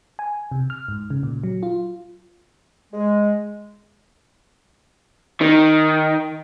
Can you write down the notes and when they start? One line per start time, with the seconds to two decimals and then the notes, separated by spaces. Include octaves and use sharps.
0.19 G#5
0.52 C3
0.70 F6
0.88 G#2
1.10 C#3
1.23 A#2
1.44 F#3
1.63 F4
2.93 G#3
5.41 D#3